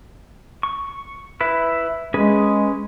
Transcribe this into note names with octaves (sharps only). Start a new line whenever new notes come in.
C#6
E4 B4 E5
G#3 C#4 G#4 B4